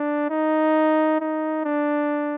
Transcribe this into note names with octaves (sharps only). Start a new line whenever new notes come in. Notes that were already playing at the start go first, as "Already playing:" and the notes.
Already playing: D4
D#4
D#4
D4